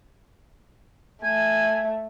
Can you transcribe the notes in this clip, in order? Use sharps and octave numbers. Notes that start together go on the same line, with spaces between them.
A3 G#5